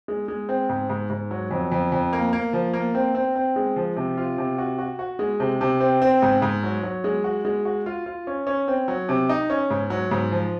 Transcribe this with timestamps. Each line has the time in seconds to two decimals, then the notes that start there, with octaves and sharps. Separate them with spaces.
0.08 G#3
0.28 G#3
0.49 C4
0.69 G#2
0.90 G#2
1.10 G#2
1.31 F#3
1.51 F2
1.72 F2
1.92 F2
2.13 A#3
2.33 A#3
2.53 F3
2.73 A#3
2.95 C4
3.15 C4
3.36 C4
3.56 G#3
3.76 F3
3.96 C3
4.18 F4
4.38 C3
4.58 F#4
4.79 F#4
4.99 F#4
5.19 G#3
5.40 C3
5.61 C3
5.80 C4
6.02 C4
6.22 G#2
6.42 G#2
6.63 F#3
6.83 F#3
7.04 G#3
7.24 F#4
7.45 G#3
7.65 F#4
7.86 F4
8.06 F4
8.27 C#4
8.47 C#4
8.68 C4
8.88 F#3
9.09 C3
9.29 D#4
9.50 C#4
9.70 G#2
9.90 F#3
10.11 G#2
10.32 F3